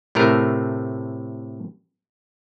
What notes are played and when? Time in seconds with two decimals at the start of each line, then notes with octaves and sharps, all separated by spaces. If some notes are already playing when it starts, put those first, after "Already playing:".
0.15 A2 C3 A3 A#4